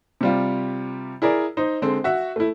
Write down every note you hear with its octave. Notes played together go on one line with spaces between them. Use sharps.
C3 G3 F4
E4 G#4 A#4 D5
D#4 C5
D3 G#3 C4 C5
F#4 E5 F#5
A3 E4